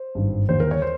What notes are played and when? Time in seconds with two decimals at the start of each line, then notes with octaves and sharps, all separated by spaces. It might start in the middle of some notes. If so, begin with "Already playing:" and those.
Already playing: C5
0.15 G#1 G2 D#3
0.49 D#2 D3 C5
0.60 A#4
0.71 C#5
0.82 C5